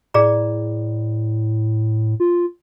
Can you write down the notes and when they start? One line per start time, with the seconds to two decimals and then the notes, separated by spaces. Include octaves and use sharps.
0.14 A2 G#4 D5 A#5
2.20 F4